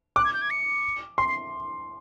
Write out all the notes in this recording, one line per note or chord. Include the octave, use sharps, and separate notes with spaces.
D6 F#6
G#6
G6
G#6
C#7
C6 C7
C7